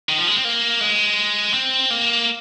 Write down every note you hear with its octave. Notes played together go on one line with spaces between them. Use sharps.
D#3
F3
G#3
C4
A#3
G#3
C4
A#3